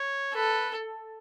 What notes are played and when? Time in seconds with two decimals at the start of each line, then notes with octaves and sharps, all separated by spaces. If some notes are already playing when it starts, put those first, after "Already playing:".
Already playing: C#5
0.34 A4 B4